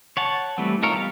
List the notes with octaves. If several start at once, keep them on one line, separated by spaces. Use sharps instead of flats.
C#5 F#5 A5
E3 G3 A3 C4
D#4 F4 A4 A#4 C#5
G3 B3 F5